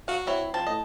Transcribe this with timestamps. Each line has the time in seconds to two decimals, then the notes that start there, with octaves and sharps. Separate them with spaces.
0.08 F#4 F5
0.27 C4 E4 C#5
0.54 F3 C4 A5
0.67 A2 D#5